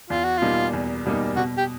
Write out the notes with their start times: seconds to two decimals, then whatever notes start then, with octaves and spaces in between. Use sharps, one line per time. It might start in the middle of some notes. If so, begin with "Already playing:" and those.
0.10 E2 F4
0.24 F#4
0.38 B2 G3 A#3 D#4 F4
0.73 E2
1.05 B2 G3 A#3 D#4
1.36 B2 F#4
1.58 G4